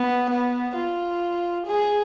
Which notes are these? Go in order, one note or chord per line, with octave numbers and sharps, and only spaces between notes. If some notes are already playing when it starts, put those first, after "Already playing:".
Already playing: B3
B3
F4
G#4